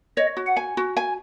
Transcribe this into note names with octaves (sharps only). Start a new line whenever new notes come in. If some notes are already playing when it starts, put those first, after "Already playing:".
C#5 D#5
F#4
F#5
G#5
F#4
G#5